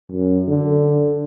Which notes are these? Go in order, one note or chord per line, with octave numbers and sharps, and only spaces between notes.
F#2
D3